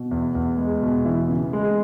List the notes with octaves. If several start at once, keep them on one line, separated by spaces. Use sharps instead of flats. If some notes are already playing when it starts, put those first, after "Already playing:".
Already playing: B2
E2
E2
G#3
B2
E3
C#3
G#3